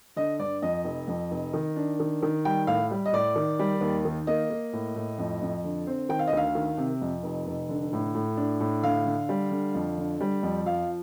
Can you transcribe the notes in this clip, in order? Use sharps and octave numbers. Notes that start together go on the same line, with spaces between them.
D3 D#5
G2 D5
F2 D#5
F1
F2
F1
D#3
D4
D#3
D#3
G3 G5
A2 F5
G3
D#5
A2 D5
D#3
G3
D#2
D#3
A#3 D#5
A#3
A2
A2
F2
F2
D3
C4
D#3 G5
F5
D#5
D2 F5
D#3
C3
F2
F1
F1
D3
A2
A2
D4
A2
D3 F5
D3
G3
D3
F2
D3
G3
F2
F3 F5